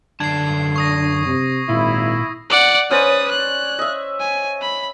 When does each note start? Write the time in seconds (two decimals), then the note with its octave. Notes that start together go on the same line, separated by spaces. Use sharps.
0.20 F#2 D3 D4 A5 G#6 C7
0.76 C#6 D#6 A#6
1.26 C3
1.69 G#1 A#2 E4
2.50 D5 F#5
2.90 C#4 B4 C5 D5 D#6
3.31 F#6
3.79 D#5 E5
4.20 G#5
4.62 B5